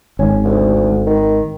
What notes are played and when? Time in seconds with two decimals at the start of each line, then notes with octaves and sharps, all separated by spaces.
0.19 G#1 C#4
0.45 D2
1.06 D#3